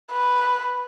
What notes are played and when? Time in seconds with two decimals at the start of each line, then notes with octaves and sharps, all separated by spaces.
0.12 B4